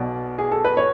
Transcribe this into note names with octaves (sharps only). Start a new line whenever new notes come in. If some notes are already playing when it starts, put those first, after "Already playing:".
Already playing: B1 B2 D5
G#4
A4
B4
C#5